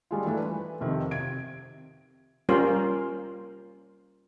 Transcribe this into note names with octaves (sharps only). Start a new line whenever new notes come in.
G3 G#3 F4
E3 A3 D4
B4
F2 C3 D#3
C3 G#6 D7
G3 A#3 C#4 F4 A#4 C5